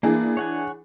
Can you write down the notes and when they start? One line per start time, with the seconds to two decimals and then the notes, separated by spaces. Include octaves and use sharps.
0.03 E3 A#3 D4 G#4
0.37 C#5 F#5 G#5